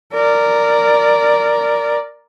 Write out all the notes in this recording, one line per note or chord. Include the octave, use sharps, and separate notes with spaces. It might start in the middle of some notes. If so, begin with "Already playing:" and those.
A#4 D5